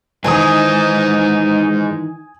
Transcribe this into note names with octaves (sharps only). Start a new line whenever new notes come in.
G#2 D#3 E3 D#4 C5 G#5 D#6